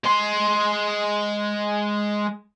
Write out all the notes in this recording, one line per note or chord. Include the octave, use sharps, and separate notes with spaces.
G#3 C6